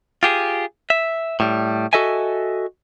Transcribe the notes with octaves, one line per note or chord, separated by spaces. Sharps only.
F4 G4 G#4
E5
A2 G3
F#4 A4 D#5 E5 G#5